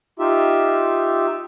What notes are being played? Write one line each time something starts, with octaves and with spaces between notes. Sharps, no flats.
D#4 F4 G4 E5